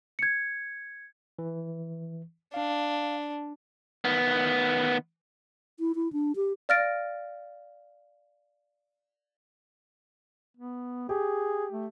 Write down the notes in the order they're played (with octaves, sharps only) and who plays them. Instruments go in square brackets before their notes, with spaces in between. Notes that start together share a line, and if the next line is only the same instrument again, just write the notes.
[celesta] G#6 C#7
[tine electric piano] E3
[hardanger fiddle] D4 [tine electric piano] F5
[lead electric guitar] D#3 B3
[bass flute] E4
E4
D4
G4
[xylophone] D5 F5 F6 A6 A#6 D7
[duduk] B3
[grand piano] G4 [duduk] G#4
[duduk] A3